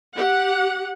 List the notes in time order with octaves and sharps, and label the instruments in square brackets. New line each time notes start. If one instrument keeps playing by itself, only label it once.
[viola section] G4 F#5